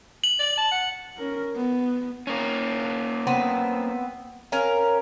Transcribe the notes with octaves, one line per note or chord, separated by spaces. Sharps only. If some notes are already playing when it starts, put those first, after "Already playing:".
F#7
D5
A5
F#5
C#4 A#4
B3
A#3 C#4
B3 C4
C#4 A#4 F5